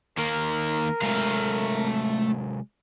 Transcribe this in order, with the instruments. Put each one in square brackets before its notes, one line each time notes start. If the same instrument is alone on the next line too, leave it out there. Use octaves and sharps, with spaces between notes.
[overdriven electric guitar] D#3 A#3 [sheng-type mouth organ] A#4
[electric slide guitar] C3 F#3 G#3 [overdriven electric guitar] A3 F5